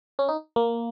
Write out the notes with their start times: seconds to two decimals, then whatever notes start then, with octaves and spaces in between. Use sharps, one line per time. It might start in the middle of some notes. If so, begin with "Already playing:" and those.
0.19 C#4
0.28 D#4
0.56 A#3